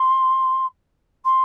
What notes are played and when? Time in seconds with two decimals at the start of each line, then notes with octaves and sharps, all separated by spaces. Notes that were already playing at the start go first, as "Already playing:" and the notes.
Already playing: C6
1.24 C6